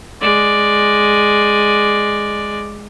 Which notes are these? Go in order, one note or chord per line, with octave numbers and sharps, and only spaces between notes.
G#3 D5